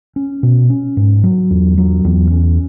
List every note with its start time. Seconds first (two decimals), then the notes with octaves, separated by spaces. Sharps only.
0.16 C#4
0.43 B2
0.70 C#4
0.97 G#2
1.24 F#3
1.50 E2
1.78 F#3
2.04 E2
2.31 C#4